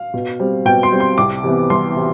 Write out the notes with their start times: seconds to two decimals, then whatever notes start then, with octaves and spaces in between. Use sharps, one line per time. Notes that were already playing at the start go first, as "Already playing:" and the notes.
Already playing: F5
0.14 B2
0.40 G3 C4
0.65 B2 G5
0.83 C6
0.92 G3 C4
1.00 C6
1.18 C2 D6
1.44 C3 E3 B3
1.70 C2 C6
1.96 C3 E3